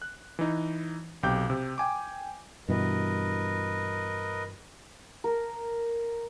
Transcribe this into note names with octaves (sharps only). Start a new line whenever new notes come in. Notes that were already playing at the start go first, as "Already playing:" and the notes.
F#6
E3 D#4
B1 C3 G5 D6 G6
C3
G5 G#5 D6
G2 B2 E3 A#4 B4 D#5
A#4